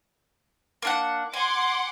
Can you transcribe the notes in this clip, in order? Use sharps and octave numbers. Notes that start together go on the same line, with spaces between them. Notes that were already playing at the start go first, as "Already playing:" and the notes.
A#3 D4 F#5
F#5 G#5 C6 D6